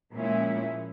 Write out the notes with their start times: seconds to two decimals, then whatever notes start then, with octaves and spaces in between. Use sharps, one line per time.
0.13 A#2 F3 G#3 C#4 E4